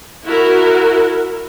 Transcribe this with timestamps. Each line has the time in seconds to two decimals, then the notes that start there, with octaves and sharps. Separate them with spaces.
0.24 E4 F#4 A#4